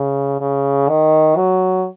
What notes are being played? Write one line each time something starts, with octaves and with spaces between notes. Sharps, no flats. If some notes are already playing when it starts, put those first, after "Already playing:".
Already playing: C#3
C#3
D#3
F#3